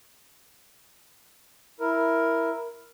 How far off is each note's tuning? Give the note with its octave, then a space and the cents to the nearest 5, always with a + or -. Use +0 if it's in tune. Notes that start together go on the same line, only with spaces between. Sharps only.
E4 +0 A#4 +5